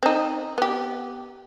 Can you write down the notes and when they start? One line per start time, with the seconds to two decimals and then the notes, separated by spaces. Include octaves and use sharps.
0.03 C4 D#4
0.58 B3 G4